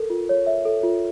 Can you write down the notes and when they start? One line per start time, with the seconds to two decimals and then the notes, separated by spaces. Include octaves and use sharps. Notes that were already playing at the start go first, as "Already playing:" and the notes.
Already playing: A4 A#4
0.10 F4
0.29 C#5
0.47 E5
0.65 A4
0.83 F4